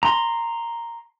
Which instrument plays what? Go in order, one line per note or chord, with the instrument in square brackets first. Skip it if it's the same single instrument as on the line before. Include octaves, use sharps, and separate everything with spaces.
[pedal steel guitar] A#5 C6